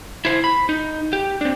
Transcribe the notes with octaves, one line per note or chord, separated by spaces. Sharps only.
E4 C5
B5
D#4
G4
C4 D4